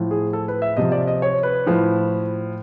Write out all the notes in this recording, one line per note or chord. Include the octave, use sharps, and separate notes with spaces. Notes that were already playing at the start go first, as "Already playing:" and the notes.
Already playing: A2 F3
G#4
A4
B4
E5
C3 F3 D#5
D5
D#5
C#5
B4
A2 F3